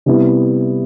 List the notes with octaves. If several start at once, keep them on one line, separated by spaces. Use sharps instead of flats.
C3 G3 B3 E4